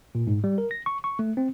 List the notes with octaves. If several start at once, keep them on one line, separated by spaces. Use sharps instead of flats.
A#2
G#2
G3
A#4
A#6
C#6
C#6
A3
C4